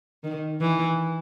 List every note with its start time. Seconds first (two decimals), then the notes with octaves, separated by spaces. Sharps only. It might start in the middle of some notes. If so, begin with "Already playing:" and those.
0.24 D#3
0.61 E3